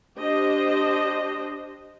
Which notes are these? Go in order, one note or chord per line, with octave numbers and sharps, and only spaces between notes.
D4 G4 C5 D#5